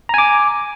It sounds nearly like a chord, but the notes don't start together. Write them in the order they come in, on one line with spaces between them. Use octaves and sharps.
A#5 G#5 D6